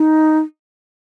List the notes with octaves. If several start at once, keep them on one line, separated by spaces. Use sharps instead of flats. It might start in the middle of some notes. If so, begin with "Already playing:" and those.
Already playing: D#4